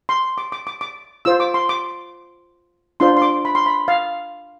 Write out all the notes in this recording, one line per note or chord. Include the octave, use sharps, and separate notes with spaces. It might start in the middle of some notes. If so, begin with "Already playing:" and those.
C6
D6
D6
D6
D6
F4 C5 E6
D6
C6
D6
D4 F4 C5 C6
C6
D6
B5
C6
B5
F5